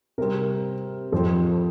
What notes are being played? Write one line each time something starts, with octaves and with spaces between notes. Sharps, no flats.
C3 G3 C4 A#4
F2 F3 C4